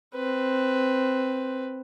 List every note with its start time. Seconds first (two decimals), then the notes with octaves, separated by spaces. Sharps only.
0.15 C4 B4